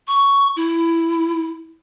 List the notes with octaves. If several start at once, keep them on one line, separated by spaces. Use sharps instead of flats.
C#6
E4